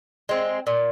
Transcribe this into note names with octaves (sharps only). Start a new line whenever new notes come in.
G#3 C4
A#2